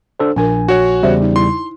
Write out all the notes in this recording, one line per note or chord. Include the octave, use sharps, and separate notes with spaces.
D4 A4 C5
A#1 D4 A#4 G#5
F#4 C#5 F#5
E2 C#3 G3 C5 E5
D#4
E4 C6